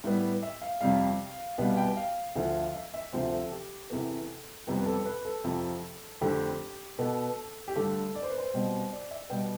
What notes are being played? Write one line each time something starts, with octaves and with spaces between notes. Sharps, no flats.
A2 G3 B3
E5
F5
F2 C3 G3 F5
C2 B2 G3 B3 F5
G5
F5
D2 D3 F3
E5
E5
D2 C3 F3 C4 C5
A4
G4
E2 C3 E3 B3 A4
F2 C3 G3 B3 G4
B4
A4
B4
A4
F2 C3 F3
F2 D3 A3 C4 G4
B2 B3 A4
G4
G2 D3 A3 A4
D5
C5
B4
C5
B2 G3 C4
D5
E5
B2 G3 B3 G5